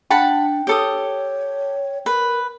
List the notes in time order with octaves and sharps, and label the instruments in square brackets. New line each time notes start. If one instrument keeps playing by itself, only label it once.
[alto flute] D4 [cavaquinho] F#5 A5 B5 [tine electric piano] G5
[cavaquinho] G4 A4 D#6 [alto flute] C#5
[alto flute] A#4 [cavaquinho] B4